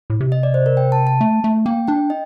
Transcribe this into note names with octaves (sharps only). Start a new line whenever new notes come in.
A2
C3
D#5
D5
C5
A#4
G5
A5
A5
A3
A3
A#3 G5
D4 G5
D#5